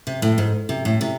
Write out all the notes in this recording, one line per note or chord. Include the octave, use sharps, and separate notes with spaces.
C3
A2
G#2
C3
A2
C3